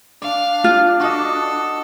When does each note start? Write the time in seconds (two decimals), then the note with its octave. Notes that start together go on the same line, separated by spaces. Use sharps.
0.22 D4 D5 F5
0.64 F4
1.00 F#4 A4 D#5